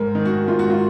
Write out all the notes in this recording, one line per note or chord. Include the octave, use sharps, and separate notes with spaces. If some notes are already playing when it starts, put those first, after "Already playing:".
Already playing: G#2 A#4
D#3
F#4
G#2 F4
F#4
F4